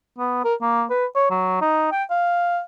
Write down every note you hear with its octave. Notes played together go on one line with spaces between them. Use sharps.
B3
A#4
A#3
B4
C#5
F#3
D#4
G5
F5